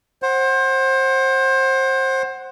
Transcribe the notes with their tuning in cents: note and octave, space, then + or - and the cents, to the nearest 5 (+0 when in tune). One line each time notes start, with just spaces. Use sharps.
C5 +25 F#5 +10